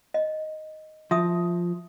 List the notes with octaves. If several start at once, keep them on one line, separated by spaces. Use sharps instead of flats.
D#5
F3 E5 D#6